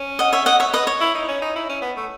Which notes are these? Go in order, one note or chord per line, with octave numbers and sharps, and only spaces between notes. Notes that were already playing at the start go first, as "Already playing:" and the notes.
Already playing: C#4
D#5 F#5
C#5 E5
D#5 F#5
C#5 E5
B4 D#5
C#5
E4
D#4
C#4
D#4
E4
C#4
B3
A3